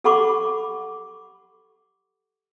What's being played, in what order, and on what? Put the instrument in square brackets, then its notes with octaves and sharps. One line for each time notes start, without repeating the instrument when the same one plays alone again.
[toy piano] G4 A4 F#5 B5 C#6 D6